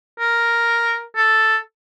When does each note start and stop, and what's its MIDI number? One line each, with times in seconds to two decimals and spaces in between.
0.20 1.02 70
1.16 1.57 69